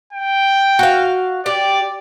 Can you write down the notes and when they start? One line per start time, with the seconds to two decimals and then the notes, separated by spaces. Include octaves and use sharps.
0.13 G5
0.79 F#4 F5
1.46 G4 D5